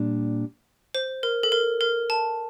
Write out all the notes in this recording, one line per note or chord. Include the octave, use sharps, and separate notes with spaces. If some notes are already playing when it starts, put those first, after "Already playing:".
Already playing: A#2 G3 D4
C5
A#4
A4
A#4
A#4
A5